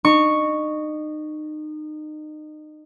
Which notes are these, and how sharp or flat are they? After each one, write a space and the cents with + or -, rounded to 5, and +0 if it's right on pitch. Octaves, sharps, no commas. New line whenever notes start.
D#4 -30 C#6 +0